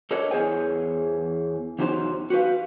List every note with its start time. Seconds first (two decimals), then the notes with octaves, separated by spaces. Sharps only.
0.11 D4 A4 A#4 C#5 D#5
0.31 E2 E3 G#4 C5 C#5 G#5
1.79 E2 F#3 D#4 G4 C5
2.30 F#4 G4 A#4 B4 F5